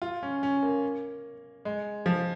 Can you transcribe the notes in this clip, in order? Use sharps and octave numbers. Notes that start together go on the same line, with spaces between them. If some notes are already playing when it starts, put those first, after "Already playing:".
F4
C#4
C#4
A#3
G#3
F3